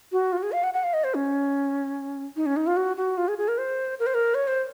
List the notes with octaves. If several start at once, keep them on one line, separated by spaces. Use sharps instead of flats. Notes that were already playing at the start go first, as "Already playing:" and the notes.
F#4
F4
F#4
G#4
F5
F#5
F#5
F5
D#5
C5
C#4
D#4
C#4
D#4
F4
F#4
F#4
F4
G#4
G#4
A#4
C5
A#4
C5
A#4
C#5
C5